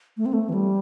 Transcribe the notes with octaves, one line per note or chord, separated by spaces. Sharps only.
A3
C4
A3
E3
G3